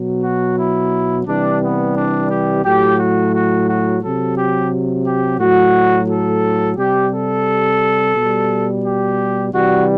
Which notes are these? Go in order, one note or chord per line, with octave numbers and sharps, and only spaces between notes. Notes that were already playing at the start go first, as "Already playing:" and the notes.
Already playing: B2 F#3
F#4
E4
C3 E3 G3 D4
B3
D4
G4
A2 F#3 G4
F#4
F#4
F#4
C3 F#3 A4
G4
G4
A2 F#3 F#4
A4
C3 G3 G4
A4
B2 G3
G4
C3 E3 G3 F#4